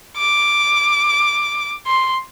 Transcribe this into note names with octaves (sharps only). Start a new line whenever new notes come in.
D6
C6